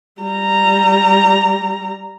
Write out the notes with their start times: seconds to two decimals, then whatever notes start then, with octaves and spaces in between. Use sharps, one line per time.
0.22 G3 A#5